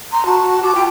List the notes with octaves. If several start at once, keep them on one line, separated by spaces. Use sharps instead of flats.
A#5 C6
F#4 A5
F#4 A5 D6
F4 G5